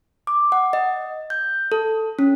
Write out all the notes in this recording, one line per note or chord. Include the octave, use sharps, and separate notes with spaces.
D6
F#5
D#5
G6
A4
C#4